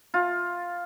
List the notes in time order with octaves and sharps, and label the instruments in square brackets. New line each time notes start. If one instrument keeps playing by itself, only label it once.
[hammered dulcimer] F4